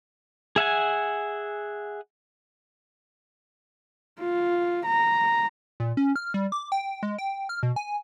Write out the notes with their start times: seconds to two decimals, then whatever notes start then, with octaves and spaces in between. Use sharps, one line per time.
0.56 G#4 E5 F#5 G#5
4.20 F4
4.85 A#5
5.80 A#2
5.97 C#4
6.16 F6
6.34 G3
6.52 D6
6.72 G5
7.03 G#3
7.18 G5
7.49 F6
7.63 B2
7.76 G#5